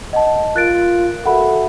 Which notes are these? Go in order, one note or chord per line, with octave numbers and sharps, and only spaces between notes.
D#5 F#5 A5
F4 A#4 F#6 A6 D7
F#4 A4 E5 F#5 B5